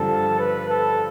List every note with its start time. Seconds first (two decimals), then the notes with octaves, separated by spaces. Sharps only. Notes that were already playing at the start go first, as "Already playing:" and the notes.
Already playing: G2 D3 F3 A4
0.39 B4
0.69 A4